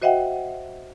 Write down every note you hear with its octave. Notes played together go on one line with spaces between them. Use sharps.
F#4 C5 D#5 E5 F#5 G5